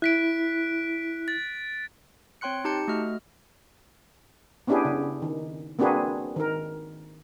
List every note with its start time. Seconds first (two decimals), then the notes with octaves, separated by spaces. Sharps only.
0.02 E4 F#6 B6 D7
1.28 A6
2.41 C4 C#5 G5 C6 F#6 C#7
2.65 D#4 G4 A5 G6 C#7
2.88 A3 F#4 D#5 F6
4.67 B3 C#4 D4 E4 G4 G#4
4.85 C#3
5.22 D#3
5.79 A#3 C4 D4 F#4 G#4 B4
6.36 D#3 A#4